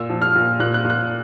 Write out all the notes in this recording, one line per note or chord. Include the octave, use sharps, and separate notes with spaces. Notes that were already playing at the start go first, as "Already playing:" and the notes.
Already playing: A#2 E6
F3
F6
A#2
A#2 F#6
F#6
A#2
F#6